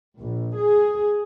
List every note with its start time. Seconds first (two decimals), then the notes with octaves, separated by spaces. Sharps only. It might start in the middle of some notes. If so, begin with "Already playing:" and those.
0.19 A#1
0.57 G#4